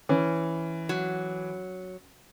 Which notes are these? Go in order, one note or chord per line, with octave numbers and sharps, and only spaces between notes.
E3 C#4
F#3